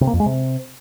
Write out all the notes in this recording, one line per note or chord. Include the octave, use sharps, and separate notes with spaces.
C3
A#3
F2
G#3
C3